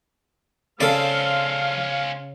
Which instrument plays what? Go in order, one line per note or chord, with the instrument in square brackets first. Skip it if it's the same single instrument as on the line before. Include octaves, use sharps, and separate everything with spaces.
[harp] C#3 [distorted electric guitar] C#4 C5 [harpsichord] A4 D5 [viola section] F5